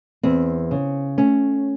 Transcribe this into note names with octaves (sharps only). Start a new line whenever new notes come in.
E2 C4
C#3
A3 C#4